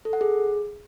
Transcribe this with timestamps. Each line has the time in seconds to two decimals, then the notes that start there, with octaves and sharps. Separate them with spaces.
0.05 A4
0.13 F#5
0.21 G#4